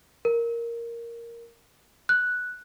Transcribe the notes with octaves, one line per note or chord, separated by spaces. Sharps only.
A#4
F#6